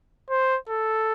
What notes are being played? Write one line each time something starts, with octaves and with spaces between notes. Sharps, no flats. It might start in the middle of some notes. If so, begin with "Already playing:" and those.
C5
A4